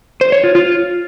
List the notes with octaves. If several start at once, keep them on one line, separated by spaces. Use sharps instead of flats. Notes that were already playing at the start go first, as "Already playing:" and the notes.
C5
C#5
F4
F4